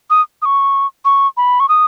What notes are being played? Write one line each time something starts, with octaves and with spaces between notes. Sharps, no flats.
D#6
D#6
C#6
C#6
B5
C#6
D#6